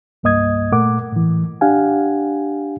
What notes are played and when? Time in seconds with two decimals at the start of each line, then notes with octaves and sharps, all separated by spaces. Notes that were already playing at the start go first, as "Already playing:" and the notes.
0.23 C2 G2 A#3 D#5 D#6 G#6
0.72 A#2 A3 A#4 F#5 D6
1.12 A2 E3
1.61 D4 G4 F5 F#5 G#5